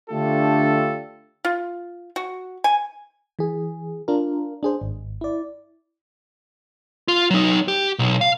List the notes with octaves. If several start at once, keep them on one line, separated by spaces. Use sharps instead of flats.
D3 A3 D4 F4 G4 A4
F4
F#4
G#5
E3 G#4
D4 F4 A#4
D4 G#4 C5
G#1
E4 D5
F4
F#3 D#4
G4
B1
F5